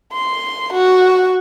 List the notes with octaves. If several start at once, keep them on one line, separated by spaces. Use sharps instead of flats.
C6
F#4